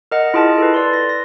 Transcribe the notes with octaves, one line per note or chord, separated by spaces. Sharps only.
A#4 D#5 F#5
E4 F4 G#4 D#5 A5
A4 B4
D5 C6
A#6
A#6